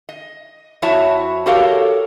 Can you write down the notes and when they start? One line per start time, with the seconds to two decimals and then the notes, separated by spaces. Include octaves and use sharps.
0.09 D#5
0.82 F2 E4 F#4 C#5 E5 A5
1.46 F#4 G4 A4 A#4 C#5 F5